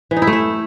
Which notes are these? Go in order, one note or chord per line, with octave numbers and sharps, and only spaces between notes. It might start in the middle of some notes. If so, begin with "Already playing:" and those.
E3
D#4
E4
A3
E4